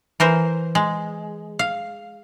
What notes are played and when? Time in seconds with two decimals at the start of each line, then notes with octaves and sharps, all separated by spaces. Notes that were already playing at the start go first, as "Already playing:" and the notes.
0.20 E3 A#4 C5
0.75 G#3
1.59 F5